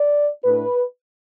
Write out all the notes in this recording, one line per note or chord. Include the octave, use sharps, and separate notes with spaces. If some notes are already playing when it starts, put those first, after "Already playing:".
Already playing: D5
A2 A3 D4 B4